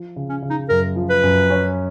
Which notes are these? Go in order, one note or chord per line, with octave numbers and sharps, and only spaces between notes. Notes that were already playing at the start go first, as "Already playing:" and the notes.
Already playing: F3
C#3
C#4
C#3
D#4
F#2 A#4
F3
B4
F#2
C#4